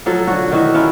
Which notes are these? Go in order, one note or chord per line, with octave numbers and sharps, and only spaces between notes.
F3 F#3 A4
D3 F#4
D#3 E3 F#4 E5
C#4 E4 F4 A#4